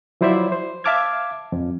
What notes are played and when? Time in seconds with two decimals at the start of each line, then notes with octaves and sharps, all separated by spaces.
0.21 F3 F#3 E4 C5 D5 E5
0.52 C5
0.84 E5 F5 A5 D6 F6 G#6
1.52 F2